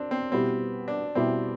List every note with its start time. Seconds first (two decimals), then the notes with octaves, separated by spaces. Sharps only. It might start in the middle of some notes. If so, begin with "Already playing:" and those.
Already playing: C4 D4
0.11 C4
0.32 B2 G3 B3 C4 E4 G4
0.88 D4
1.15 B2 G3 B3 C4 E4 G4